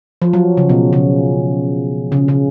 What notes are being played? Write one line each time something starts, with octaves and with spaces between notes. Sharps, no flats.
F3
F#3
C#3
B2
C#3
C#3
C#3